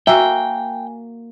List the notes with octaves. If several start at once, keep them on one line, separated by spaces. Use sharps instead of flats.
A#3 F#4 E5 G5 G#5